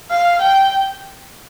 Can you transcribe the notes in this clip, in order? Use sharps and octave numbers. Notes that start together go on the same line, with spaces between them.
F5
G5